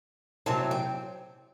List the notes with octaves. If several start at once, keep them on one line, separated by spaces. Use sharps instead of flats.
E2 C3 F#3 C4 A5
G5